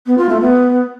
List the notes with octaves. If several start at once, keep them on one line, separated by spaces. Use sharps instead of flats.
B3
F4
A3
B3